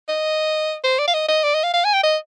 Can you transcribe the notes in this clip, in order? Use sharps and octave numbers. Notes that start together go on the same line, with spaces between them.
D#5
C5
D5
F5
D#5
D#5
D5
D#5
F5
F5
G#5
G5
D#5